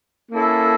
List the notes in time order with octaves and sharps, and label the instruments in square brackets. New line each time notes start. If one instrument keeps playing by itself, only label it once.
[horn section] A#3 C#4 E4 A4